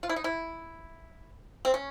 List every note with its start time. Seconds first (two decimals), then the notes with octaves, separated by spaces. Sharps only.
0.03 F4
0.09 E4
0.16 D#4
0.24 E4
1.65 C4
1.74 C#4